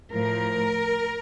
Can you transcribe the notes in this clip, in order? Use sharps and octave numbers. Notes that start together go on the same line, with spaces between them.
A2 F3 A#4